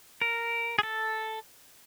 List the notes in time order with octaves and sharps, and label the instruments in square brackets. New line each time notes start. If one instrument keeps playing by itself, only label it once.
[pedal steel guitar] A#4
G#4
A4